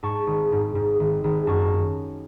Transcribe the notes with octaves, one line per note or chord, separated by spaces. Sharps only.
G#2 A5 C#6
G#1
G#2
G#2
G#1
G#1
F#2 A5 C#6